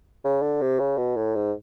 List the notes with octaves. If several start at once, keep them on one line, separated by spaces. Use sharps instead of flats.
C#3
D3
C3
C#3
B2
A2
G#2